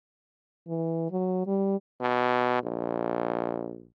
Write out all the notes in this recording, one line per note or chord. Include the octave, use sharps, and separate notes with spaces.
E3
F#3
G3
B2
A#1